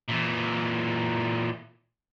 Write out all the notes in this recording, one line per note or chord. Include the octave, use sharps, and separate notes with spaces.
A#2 E3